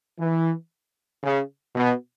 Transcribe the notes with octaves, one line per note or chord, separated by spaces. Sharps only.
E3
C#3
B2